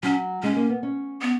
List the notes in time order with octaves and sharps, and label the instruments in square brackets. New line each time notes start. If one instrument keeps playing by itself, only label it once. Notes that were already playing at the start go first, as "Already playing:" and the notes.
[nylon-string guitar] F#3 [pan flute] C#4
[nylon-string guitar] G#3 [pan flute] C#4
[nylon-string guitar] A#3
B3
C#4
[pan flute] B3